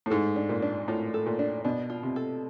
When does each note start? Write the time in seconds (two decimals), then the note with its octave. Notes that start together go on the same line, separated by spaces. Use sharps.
0.06 A2
0.10 G#2 A4
0.36 D4
0.49 A#2
0.62 D4
0.88 A2 F4
1.14 A4
1.26 A#2
1.39 D4
1.64 B2 D4
1.90 F4
2.03 C3
2.16 A4